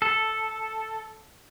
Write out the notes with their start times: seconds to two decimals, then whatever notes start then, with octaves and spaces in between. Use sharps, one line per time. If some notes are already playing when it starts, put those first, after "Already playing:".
0.02 A4